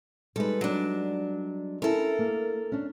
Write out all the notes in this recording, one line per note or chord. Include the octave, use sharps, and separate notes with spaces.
G3 G#3 D#4 A4 B4
F#3 D4
C#4 E4 A4 A#4
A#3
C#4 D4